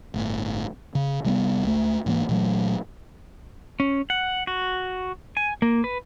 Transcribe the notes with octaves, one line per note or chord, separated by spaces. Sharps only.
G1 A2
C#3
C3 G3 A#3 B3
C#2 A3
G#2 E3 A#3
A#2 E3 F#3 A3
C#4
F#5
F#4
G#5
A#3
B4